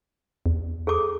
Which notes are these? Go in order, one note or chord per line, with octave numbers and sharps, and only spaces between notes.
E2
G#4 A4 D6